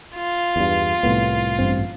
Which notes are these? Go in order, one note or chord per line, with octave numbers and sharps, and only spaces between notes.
F4
E2 G2
C2 A2 B3
A1 G2 C4